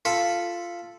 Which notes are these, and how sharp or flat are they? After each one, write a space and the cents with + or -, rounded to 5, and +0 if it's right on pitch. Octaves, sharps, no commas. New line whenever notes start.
F4 -10 A4 +0 B5 +0